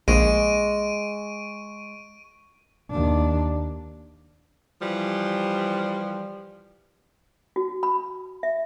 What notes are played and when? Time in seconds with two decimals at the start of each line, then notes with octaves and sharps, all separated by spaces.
0.08 A#1 G#3 C#6 D7 D#7
2.90 D#2 D4
4.82 E3 F3 G3
7.56 F#4
7.83 B5
8.43 E5